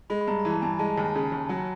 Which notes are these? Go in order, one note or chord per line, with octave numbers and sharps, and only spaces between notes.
G#3 B5
B5
G2 A#5
A#5
E3
A5
G2 G#5
G#3 A5
D#2 G#5
C#3
D#2
F#3